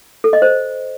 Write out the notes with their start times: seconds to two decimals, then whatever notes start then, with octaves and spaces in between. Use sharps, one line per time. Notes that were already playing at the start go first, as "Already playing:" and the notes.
0.24 A4
0.33 D#5
0.42 C5